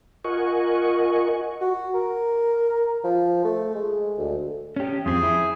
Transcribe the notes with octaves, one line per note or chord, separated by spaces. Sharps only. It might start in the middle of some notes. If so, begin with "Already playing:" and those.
F4 A#4 D#5 F#5 G#5 C#6
F#4
A#4
F3
A3
G#3
D2
C#4 G4
F2 C4 G#4
E4